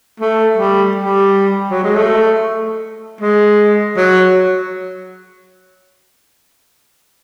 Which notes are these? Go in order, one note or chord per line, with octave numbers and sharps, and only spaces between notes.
A3
G3
G3
F#3
G#3
A3
G#3
F#3